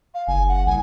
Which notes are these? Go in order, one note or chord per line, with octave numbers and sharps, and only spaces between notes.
F5
F#1 G#5
F#5
C2 G#5